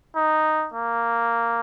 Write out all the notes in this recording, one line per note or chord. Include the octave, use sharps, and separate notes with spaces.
D#4
A#3